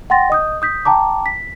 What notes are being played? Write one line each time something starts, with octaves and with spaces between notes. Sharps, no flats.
F#5 G5 C6 A6 A#6
D#5 D#6 G6
D#6 G6 B6
G5 A5 A#5 D6
B6